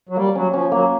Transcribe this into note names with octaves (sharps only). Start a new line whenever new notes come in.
F#3
G3 A#3
F#3 C#4
F3 C#4
F#3 A#3